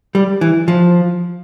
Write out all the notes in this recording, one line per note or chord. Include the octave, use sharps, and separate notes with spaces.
G3
E3
F3